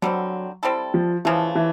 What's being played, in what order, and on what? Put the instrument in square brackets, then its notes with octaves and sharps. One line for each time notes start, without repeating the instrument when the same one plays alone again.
[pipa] D3 G3 C4 [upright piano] F#3
[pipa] G3 C4 E4 A4
[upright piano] F3
[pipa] C#3 F3 A3 [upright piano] E3
[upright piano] E3